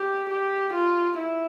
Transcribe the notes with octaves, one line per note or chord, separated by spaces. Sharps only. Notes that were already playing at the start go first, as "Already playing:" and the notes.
Already playing: G4
G4
F4
E4